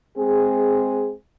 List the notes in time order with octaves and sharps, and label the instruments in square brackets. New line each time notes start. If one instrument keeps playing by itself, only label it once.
[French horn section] G#3 C4 G#4